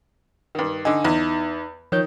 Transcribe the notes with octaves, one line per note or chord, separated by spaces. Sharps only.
G2 D#3
D3 D#4 G#5
E2 D#4
D#3 F3 C#5 G6